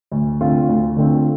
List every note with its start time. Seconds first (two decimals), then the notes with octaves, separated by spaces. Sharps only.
0.11 D2
0.41 D3 A3 C4 F4
0.69 D2
0.96 D3 A3 C4 F4